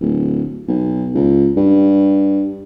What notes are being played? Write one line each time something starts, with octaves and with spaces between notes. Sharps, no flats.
D1
B1
C#2
G2